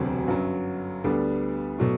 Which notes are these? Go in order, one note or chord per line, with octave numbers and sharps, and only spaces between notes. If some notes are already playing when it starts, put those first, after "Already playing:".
Already playing: E1 D2 C3 F#3 C4
G1 F#2 F#3
D2 D3 G3 B3 D4
B2 F#3 A3